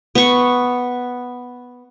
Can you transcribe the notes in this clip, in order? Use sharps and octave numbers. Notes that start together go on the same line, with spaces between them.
B3 C#6